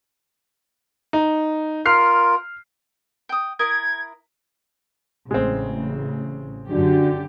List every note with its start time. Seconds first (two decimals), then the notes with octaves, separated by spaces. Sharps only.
1.13 D#4
1.86 F4 A#4 F6 C7
3.29 G5 D#6
3.59 E4 A#4 D#6 G#6
5.31 A1 C#3 G#3 C4
6.70 F#2 D3 D4 F#4 G4